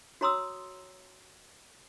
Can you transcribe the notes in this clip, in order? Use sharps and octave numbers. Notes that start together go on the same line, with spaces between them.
F#4 C#5 A#5 C6 D#6 E6